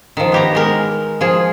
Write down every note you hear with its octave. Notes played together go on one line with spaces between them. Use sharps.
D#3 F3
B3 G4 A#5
G#3 A#4
F3 G#4